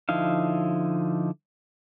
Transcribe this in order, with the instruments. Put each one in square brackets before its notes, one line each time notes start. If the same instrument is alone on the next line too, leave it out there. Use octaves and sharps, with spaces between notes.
[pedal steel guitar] D3 F3 D#4 E4 F5